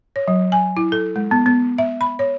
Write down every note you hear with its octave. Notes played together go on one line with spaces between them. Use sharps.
C#5
F#3
G#5
E4
A4
G#3
B3
B3
E5
B5
C#5